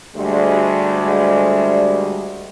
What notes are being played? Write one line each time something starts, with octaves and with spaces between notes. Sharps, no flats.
D2 G3 G#3